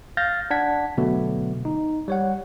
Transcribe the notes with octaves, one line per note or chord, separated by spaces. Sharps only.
F5 F6 G6 A6 A#6
D4 F#5 G#6 B6
B2 D3 F#3 A3 B3
D#4
G3 C#5 F#5